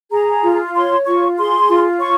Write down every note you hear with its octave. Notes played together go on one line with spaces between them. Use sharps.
G#4 A#5
F4
C#5 C6
F4 C#6
G#4 C6
F4
C#5 C#6